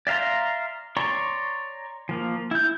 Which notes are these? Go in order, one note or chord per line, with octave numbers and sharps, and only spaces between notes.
D5 E5 F5 A#5 C6
C#5 D5 A#5 C6 C#6
F3 A#3
E4 G6